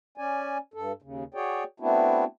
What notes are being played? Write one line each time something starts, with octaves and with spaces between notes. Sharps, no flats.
C#4 D5 G#5
G2 A4
D#2 C#3
F#4 G#4 C#5 D5 G5
A3 B3 C4 D4 E4 F#4